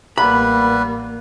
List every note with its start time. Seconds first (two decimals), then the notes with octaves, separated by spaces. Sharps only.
0.18 A1 G3 A#3 B3 B4 B5